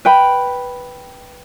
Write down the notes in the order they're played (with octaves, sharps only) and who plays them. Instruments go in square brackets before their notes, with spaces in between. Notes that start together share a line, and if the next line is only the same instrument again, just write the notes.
[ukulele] B4 G5 B5